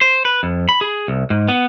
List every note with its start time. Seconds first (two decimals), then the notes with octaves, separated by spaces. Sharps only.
0.01 C5
0.25 B4
0.43 F2
0.69 B5
0.81 G#4
1.08 C2
1.30 G#2
1.48 B3